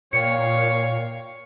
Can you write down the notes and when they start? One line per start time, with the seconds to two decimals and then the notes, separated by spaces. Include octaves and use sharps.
0.13 A#2 C#5 F5 G5 C#7